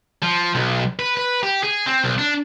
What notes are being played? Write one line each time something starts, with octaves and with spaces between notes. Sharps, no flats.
F3
B1
B4
B4
G4
G#4
C4
B1
D4